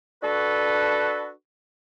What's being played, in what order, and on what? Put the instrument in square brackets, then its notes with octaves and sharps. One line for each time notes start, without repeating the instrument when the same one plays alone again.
[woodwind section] D4 F#4 A4 B4